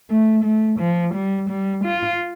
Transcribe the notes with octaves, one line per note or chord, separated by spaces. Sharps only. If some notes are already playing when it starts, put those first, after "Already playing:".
A3
A3
F3
G3
G3
F4